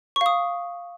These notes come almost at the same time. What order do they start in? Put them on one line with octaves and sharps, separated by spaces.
C#6 F5 D#6